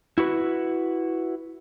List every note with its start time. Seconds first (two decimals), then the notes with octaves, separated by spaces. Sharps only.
0.18 E4 F#4 B4